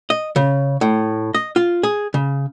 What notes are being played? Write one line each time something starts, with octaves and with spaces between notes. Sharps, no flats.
D#5
C#3
A2
D#5
F4
G#4
C#3